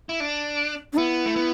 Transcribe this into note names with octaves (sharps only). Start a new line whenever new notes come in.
E4
D4
D4
B3 E4
A3
B3